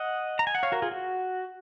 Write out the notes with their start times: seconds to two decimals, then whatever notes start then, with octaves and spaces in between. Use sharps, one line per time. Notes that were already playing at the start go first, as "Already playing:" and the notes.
Already playing: D#5 F#5
0.39 A#5
0.47 G#5
0.55 F#5
0.63 C#5 F5
0.72 F#4 A#4
0.82 F4 G#4
0.91 F#4